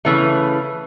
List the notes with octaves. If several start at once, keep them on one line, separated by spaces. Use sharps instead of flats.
C#3 E3 A3